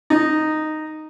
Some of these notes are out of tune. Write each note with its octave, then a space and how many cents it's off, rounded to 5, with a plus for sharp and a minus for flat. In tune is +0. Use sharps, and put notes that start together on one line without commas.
D#4 -5